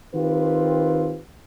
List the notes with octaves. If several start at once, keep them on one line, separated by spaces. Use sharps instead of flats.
D#3 C4 F4 G4 B4